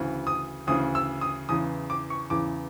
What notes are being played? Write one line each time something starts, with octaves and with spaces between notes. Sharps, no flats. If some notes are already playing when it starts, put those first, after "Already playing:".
Already playing: D2 C#3 E3
D#6
D2 C#3 E3 D#6
E6
D#6
E2 C#3 E3 D#6
D6
C#6
E2 C#3 E3 D6